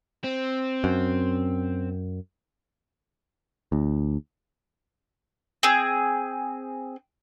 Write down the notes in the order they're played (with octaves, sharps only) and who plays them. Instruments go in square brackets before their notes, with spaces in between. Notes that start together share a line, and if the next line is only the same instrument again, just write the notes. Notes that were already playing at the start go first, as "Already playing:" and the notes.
[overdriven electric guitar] C4
[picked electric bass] F#2
D2
[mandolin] C4 G#4